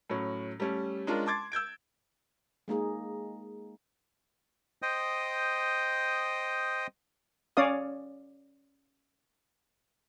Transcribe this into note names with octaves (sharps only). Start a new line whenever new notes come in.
A2 F#3 C#4
G3 A3 C#4
G#3 C#4 D4 F4 A#4
A5 C6 D6 G#6 A6
E6 G6 G#6 D7
G#3 A#3 D#4 G#4
C5 D#5 G5 D#6
C#4 C#5 D5 F5 D#6